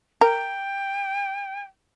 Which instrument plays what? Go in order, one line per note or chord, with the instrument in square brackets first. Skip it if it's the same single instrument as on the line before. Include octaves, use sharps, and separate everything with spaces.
[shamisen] A#4 [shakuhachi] G5